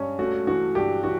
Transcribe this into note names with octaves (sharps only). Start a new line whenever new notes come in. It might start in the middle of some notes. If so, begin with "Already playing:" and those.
Already playing: G2 C#4
A3 F#4
E3 F#4
G2 G4
E3 F#4